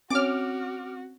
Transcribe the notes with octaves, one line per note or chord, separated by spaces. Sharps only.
C4 C#4 F#4 C#5 D6 F6